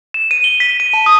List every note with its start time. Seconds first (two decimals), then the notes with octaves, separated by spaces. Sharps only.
0.14 E7
0.31 D#7
0.44 G7
0.60 B6
0.80 D#7
0.94 A5
1.06 D#6